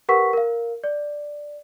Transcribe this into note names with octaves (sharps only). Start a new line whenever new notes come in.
G4 A#4 B4 F#5 C#6 B6
A#4 F5
D5